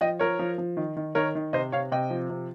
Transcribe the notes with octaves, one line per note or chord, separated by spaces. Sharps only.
F3 D#5 G5
F3 A#4 C#5
F3
F3
D#3
D#3
D#3 A#4 C#5
D#3
C3 C5 D#5
C3 C#5 F5
C3 D#5 G5
F3
C3